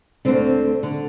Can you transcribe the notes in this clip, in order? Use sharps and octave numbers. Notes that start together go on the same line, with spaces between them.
D2 D3 C4
D3